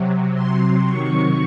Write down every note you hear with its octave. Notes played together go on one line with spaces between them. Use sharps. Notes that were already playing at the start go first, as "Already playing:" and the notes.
Already playing: C3 F#3
C6
C3 D#3 F#3 C#6